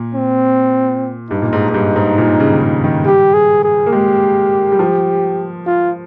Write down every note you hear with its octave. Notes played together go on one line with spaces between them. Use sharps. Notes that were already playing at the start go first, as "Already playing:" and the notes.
Already playing: A#2
C4
G2 D#4
A#2
G#2
G#2
G2
G#2
A#2
C#3
D#3
C#3
D#3
G3 G4
G#4
G#4
A#3
G#3 G4
G3
F3
F4